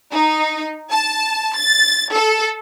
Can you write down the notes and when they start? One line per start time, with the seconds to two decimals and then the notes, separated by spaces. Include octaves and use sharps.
0.12 D#4
0.92 A5
1.58 A6
2.13 A4